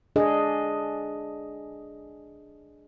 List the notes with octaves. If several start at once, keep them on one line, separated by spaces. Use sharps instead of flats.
D4 G#4 D#5